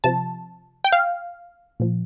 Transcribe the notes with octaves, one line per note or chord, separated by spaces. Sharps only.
C3 F3 A5
G5
F5
A#2 F3